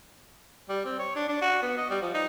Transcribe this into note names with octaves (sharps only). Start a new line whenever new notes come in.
G3
C4
C#5
D4
D4
F#4
B3
D#5
G3
F3
D#4